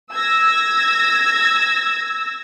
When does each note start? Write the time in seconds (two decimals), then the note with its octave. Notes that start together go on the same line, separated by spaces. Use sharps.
0.12 E6 G#6 A#6